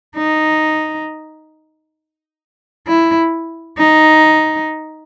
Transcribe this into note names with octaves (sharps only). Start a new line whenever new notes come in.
D#4
E4
D#4